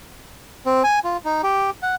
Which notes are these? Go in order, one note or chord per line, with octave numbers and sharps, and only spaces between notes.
C4
G#5
F4
D#4
G4
F#5